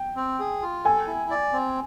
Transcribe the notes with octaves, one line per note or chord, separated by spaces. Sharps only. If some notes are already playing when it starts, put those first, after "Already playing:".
Already playing: G5
C4
G#4
F4
A4 G#5
E4
D5
C4